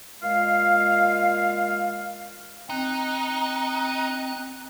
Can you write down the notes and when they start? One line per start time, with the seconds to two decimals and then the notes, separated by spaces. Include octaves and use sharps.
0.22 A#2 G#3 F5
2.70 C4 D#4 F#6